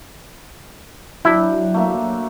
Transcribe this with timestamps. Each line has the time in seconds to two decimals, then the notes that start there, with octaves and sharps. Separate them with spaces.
1.25 F#3 D4 E4 G5
1.74 A3 A#3 E5